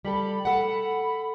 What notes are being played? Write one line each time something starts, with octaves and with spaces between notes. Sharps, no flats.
G3 G4 A4 B5
A4 F#5